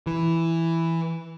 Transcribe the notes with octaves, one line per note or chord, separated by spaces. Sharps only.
E3